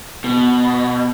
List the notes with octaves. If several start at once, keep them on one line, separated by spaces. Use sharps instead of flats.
B2